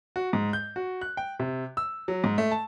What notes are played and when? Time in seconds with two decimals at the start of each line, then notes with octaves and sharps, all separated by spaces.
0.16 F#4
0.33 G#2
0.53 G6
0.76 F#4
1.01 F#6
1.17 G5
1.40 C3
1.77 E6
2.08 F#3
2.24 G#2
2.38 A3
2.51 A5